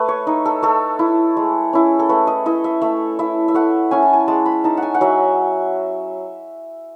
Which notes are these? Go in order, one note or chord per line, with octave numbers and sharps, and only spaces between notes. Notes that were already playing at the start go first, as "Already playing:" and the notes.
Already playing: A3 B4
C#5
D#4
A4
A3 A4
E4
G#3
C#4 E4
A4
A3 B4
D#5
E4 D#5
E5
A3 E5
E4 E5
E5
A3 F#5
C#4 E4 G#5
A5
G#5
G#3 A5
B5
D#4 A5
F#5
G#5
F#5
F#3 E5